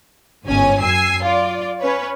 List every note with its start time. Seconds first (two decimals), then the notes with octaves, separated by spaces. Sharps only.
0.47 G1 G#2 C#4 G#5
0.82 F#2 G#5 E6 C7
1.24 F4 D5
1.80 C#4 B4 C#5